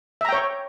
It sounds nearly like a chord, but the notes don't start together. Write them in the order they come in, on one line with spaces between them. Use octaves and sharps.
E5 A#5 G5 C#5